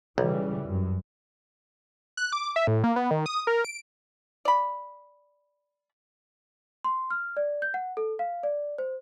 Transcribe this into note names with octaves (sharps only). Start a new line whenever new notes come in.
B1 C#3 E3 G3
F#2
F#6
D6
E5
A2
A#3
B3
D#3
D#6
A#4
D7
D5 B5
C6
F6
D5
G6
F#5
A4
F5
D5
C5